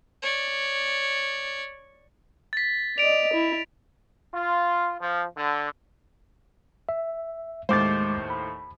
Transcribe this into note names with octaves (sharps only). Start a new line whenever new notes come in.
C#5 D5
A6 B6
D5 D#5 D7 F7
E4
F4
F3
D3
E5
D#2 A2 G#3 C5 D6 A6
B5